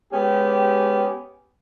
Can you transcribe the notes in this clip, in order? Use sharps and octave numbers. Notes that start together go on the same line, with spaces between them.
G#3 B3 C#4 G4